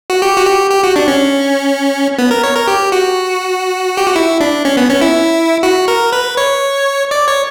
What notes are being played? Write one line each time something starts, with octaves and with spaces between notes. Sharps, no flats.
F#4
G4
F#4
G4
G4
F#4
D4
C#4
B3
A#4
C#5
A#4
G4
F#4
G4
F#4
E4
D4
C#4
B3
C#4
E4
F#4
A#4
B4
C#5
D5
C#5